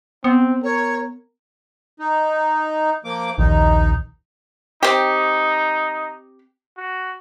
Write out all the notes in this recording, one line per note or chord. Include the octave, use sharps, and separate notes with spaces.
B3 C4
A#4 C#5
D#4
F3 A#3 D6
A#1 D#2 D#3 D#4
C4 D#4 G4
F#4